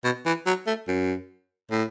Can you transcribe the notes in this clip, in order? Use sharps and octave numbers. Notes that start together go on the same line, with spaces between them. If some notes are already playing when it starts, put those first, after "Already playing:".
B2
E3
F#3
A3
F#2
A2